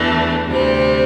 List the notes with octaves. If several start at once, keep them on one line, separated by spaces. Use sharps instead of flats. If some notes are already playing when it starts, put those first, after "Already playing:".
Already playing: E2 E3 A3 D4
D2 C3 G3 C4